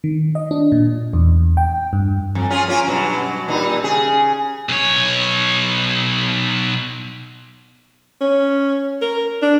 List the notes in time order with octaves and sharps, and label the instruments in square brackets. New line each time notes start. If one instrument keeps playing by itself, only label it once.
[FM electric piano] D#3
D#5
D4
A#2
E2
G5
G2
[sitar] F2
C#4 F4 G#4
A#3 C#4 F4
G2 B2 F#3
A#2 G3 D#4
C#3 G#4
[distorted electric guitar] B1 C#5
[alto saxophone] C#4
A#4
D4